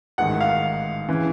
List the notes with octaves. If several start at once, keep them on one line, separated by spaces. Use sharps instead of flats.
A1 G#2 D#3 F#5
F5
C#3 E3